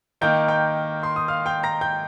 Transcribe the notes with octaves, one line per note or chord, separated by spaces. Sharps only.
D#3 A#3 D#4 G5 G6
G5 G6
C6
D#6
F5 F6
G5 G6
A#5 A#6
G5 G6